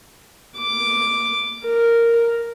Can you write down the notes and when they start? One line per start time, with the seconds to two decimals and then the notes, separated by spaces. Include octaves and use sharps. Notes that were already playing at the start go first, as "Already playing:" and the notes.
0.58 D6
1.66 A#4